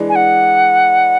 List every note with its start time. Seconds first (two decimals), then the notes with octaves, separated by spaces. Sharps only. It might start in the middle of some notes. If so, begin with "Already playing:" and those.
Already playing: E3 G#3 D4
0.09 G#5
0.16 F#5